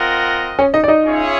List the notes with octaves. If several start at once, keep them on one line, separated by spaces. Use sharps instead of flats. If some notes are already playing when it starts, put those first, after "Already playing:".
Already playing: C4 F4 A#4 D#5 F#5
C#4 C#5
D#4 D#5
D5
D#4 D#5
C#4 F4 G#4 C#5 E5